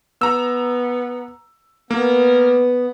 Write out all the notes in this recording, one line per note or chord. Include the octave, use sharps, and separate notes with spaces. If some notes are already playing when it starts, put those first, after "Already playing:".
B3 A#5 E6
A#3 B3 A#4